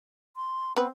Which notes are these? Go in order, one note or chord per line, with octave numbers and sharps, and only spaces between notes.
C6
B3 C4 B4